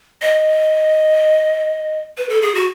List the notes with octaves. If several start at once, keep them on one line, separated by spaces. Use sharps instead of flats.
D#5
B4
A4
G#4
F#4